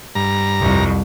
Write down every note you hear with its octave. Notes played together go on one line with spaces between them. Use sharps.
G2 A#5
C2 F2